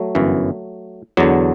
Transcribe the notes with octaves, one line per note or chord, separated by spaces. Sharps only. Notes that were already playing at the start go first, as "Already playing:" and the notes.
Already playing: F#3 A3
G1 F#2 E3
E2 D3 F#3